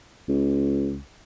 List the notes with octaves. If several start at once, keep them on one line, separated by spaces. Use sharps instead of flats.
C#2